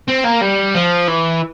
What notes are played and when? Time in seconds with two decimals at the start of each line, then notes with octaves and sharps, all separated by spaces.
0.09 C4
0.25 A#3
0.42 G3
0.75 F3
1.08 E3